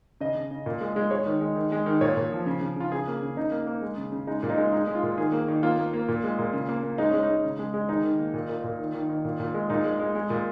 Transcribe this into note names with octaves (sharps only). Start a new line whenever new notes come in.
C#3 D#5
C#3
C#3
A#2
G#3
G#3
G#3 C#5
D#3
G#3
D#3
G#3
D#3
A#2 C#5
A#2
F3
C#3
C#3
C#3 F4
C#3 G#4
A#3
C#3
C#3 D#4
A#3
A#3
G#3
C#3
C#3
G#3 D#4
A#2
D#4
G#3
G#3 D#4
G#3
F4
A#2
D#3 G#4
A#3
D#3
A#3 F4
A#3
A#3
A#2
G#3
A#2
C#3
A#3
A#3
G#3 D#4
G#3 C#4
D#4
G#3
C#3
G#3
G#3
D#3 D#4
D#3
A#3
A#2
A#2
A#2
D#3
D#3
D#3
A#2
A#2
G#3
A#2 D#4
G#3
G#3
G#3
A#2